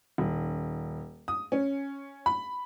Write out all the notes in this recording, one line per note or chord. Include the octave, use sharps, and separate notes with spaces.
D#1
D#6
C#4
B5